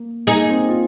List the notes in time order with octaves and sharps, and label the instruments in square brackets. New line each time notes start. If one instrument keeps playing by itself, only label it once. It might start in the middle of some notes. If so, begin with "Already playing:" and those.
Already playing: [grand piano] A#3
[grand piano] A#3 [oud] D#4 G#4
[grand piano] C4
F4